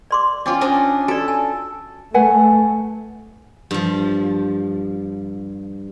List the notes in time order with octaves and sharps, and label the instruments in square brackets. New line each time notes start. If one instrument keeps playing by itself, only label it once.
[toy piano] D5 C6 D6
[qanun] C#4 F4 [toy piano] C#5 G5 D6
[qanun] C#4 D4 D#5
[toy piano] F#4 D5 [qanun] A4
[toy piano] G#5 A5
[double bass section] A3 [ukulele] B4 F#5 G#5
[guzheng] G2 F3